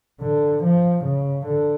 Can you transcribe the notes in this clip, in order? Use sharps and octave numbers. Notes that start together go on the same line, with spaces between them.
D3
F3
C#3
D3